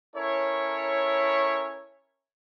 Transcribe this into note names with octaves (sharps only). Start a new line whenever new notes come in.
C#4 E4 A4 A#4 C#5